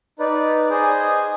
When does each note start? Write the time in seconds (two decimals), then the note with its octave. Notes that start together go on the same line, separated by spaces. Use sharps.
0.19 D#4 B4 D5
0.70 G#4 C5 D#5 G#5